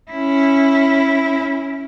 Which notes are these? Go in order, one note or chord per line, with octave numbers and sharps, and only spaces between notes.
C#4 E4